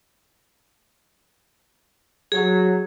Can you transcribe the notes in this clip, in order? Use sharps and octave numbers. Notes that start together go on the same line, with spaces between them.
F#3 G#4